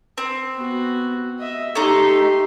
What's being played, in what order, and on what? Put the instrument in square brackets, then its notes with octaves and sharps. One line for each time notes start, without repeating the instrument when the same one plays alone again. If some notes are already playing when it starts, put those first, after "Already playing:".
[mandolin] C4
[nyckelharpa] B3 F#4
D#5 E5
[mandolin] A3 D#4 [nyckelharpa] G4 C6